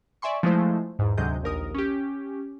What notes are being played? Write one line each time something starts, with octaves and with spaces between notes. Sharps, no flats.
D5 E5 G#5 C6 C#6
F3 G#3 A3 E4 C5
E2 G#2
D2 C3 F#3 G#3 D#5 G6
A#1 D#2 A#4 D#6
C#4 G4